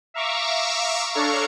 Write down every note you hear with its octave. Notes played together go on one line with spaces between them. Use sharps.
E5 F5 A#5 C#6 D6 E6
D4 A4 C#5 F5 A#5 C#6